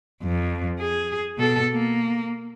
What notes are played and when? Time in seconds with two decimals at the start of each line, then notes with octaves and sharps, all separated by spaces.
0.23 F2
0.80 G#4
1.38 B2 A4
1.72 A#3